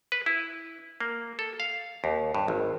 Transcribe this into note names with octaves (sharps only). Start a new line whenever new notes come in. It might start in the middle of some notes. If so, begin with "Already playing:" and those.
B4
E4
A#3
A4
F5
D#2
G2
G#1